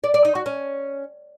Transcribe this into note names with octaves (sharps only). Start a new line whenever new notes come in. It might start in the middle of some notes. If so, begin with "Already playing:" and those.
D5
D5
D#4
F#4
C#4